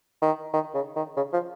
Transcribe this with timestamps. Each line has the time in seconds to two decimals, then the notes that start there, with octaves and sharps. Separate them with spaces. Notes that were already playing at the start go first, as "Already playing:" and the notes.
0.22 D#3
0.53 D#3
0.74 C#3
0.96 D#3
1.16 C#3
1.33 F3